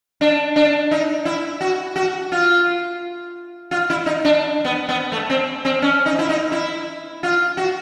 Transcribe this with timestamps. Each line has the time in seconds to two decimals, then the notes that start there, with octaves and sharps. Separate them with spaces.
0.21 D4
0.56 D4
0.91 D#4
1.25 E4
1.61 F#4
1.96 F#4
2.32 F4
3.71 F4
3.90 E4
4.06 D#4
4.25 D4
4.65 B3
4.89 B3
5.12 A3
5.30 C4
5.65 C4
5.82 C#4
6.06 D#4
6.19 E4
6.29 D#4
6.52 E4
7.23 F4
7.57 F#4